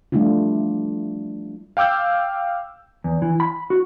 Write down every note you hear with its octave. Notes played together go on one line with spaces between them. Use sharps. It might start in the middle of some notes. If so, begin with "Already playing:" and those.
F3 G3 A3 D4 E4 F4
F5 G5 D6 E6 G6
E2
E3
B5
F#4